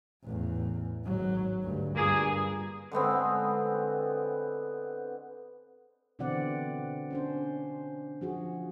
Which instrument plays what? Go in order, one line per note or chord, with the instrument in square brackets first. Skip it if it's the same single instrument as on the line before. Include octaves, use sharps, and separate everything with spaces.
[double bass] A1 E2
G#1 F#3
D2 G2
[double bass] G2 [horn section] A#3 F4 G#4
[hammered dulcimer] D3 G#3 B3 C4
[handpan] B2 D3 E3 C4 D5 F#5
C#4 D4 C5
F3 F#4 G#4